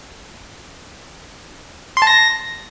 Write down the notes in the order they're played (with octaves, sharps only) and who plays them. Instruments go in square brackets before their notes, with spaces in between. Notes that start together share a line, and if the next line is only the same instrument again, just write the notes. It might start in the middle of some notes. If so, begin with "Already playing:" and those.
[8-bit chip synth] C6
A5
A#6